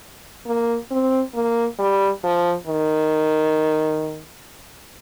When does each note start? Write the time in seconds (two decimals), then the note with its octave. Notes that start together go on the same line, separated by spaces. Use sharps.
0.47 A#3
0.91 C4
1.35 A#3
1.79 G3
2.24 F3
2.68 D#3